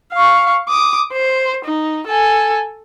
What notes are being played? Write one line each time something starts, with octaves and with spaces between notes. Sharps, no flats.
F5 C#6
D6 D#6
C5
D#4
A4 G#5